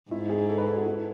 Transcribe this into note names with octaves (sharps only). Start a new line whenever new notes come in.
G#2 E4
G#4
A4
B4
A4
F#4
E4